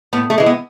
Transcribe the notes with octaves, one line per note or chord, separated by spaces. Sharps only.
A2 B3
A3
E3 G#3
B3